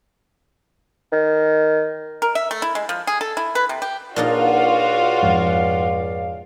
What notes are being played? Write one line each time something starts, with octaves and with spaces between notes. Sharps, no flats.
D#3
A#4
E5
A3
E4
G#3
F3
G#4
A4
E4
B4
C3
G4
C#2 A#2 D4 D#4 F4 F#4 D5 F5
F2 G#2